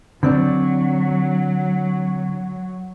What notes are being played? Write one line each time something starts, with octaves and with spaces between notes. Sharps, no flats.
D3 F#3 C4 D4